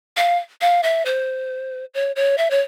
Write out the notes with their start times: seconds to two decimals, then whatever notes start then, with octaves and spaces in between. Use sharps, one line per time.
0.17 F5
0.61 F5
0.83 E5
1.06 C5
1.94 C#5
2.16 C#5
2.38 E5
2.51 C#5